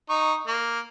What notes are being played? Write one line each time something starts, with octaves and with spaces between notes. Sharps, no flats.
D#4 C#6
A#3